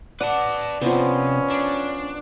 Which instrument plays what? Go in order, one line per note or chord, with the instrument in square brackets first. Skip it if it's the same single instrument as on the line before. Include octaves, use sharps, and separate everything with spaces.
[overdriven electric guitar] B4 A5 [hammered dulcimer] D5 [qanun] F#5
[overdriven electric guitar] C3 [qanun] F3 B3 [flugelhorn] C#4
[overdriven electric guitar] D4